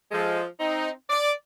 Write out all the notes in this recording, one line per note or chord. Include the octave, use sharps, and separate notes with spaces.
F3 G#3 A4
C4 D#4
D5